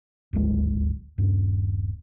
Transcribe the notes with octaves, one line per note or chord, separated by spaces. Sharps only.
D#1 G#1 D2 G#3
D#1 G2